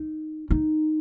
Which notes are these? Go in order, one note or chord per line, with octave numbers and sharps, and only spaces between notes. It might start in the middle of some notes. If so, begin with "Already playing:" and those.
Already playing: D#4
D#4